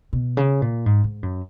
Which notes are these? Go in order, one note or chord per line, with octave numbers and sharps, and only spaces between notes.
B2
C#3
A#2
G#2
G#2
F#2